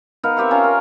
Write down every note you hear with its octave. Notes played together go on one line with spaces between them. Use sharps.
B3 D#4 A#4 F5
C4 G4 E5 C#6
C#4 F4 F5 A#5
A#4